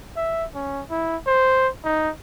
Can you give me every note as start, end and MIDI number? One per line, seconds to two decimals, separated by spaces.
0.17 0.44 76
0.55 0.82 61
0.90 1.16 64
1.27 1.68 72
1.84 2.10 63